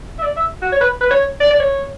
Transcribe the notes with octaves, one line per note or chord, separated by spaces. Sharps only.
E5
D5
E5
F#4
C#5
B4
B4
C#5
D5
D5
C#5